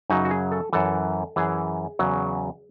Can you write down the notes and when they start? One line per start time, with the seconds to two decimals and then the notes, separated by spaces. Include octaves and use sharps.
0.10 F#2 C#3 F#3 D#4
0.25 F#4
0.31 G#4
0.52 A4
0.73 F#2 E3 A4
1.36 F#2 E3 G#4
1.99 E2 C#3 F#3